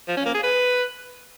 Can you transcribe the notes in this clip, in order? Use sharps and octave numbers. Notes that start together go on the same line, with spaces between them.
F3
C#4
A#3
G#4
B4